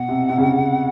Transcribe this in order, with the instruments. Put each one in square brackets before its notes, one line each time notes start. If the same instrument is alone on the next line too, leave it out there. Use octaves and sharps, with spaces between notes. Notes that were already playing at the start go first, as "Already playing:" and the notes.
Already playing: [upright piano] B2 [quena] F#5
[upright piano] C3
C3
C#3